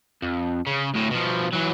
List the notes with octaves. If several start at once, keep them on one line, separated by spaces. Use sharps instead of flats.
F2
C#3
D2 A2
B2 F3
E3 F#3